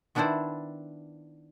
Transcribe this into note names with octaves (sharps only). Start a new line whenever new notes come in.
D#3 B3 D4 E4 C5 D5